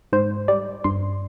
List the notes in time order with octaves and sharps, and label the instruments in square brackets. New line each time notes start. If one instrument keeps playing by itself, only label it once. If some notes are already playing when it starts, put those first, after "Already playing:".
[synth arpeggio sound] G#2 C5
G3 D5
G2 C6